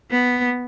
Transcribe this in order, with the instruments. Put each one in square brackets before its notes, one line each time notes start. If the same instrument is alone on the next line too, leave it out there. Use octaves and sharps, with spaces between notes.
[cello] B3